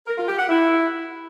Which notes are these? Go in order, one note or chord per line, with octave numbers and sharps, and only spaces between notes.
A#4
F4
G4
F#5
E4